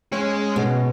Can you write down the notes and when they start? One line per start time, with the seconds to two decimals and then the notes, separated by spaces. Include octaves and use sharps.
0.12 G#3 C#4
0.56 B2